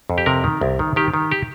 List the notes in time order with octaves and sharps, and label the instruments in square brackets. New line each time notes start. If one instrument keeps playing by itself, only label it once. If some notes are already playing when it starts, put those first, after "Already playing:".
[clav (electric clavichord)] F2
G4
C3 A#4
D#3
C2
D#3
D#3 G4
D#3
G4